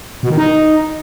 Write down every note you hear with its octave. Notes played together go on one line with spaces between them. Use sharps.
B2
D#3
D#4